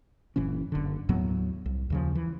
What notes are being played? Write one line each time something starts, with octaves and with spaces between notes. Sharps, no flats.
F#1 A#2 E3 C#4
F#1 D3
D#2 A2 F#3 B3
C2
D#2 C#3 F3
E3